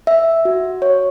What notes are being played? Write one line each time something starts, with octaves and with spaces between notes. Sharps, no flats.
E5
F#4
C#5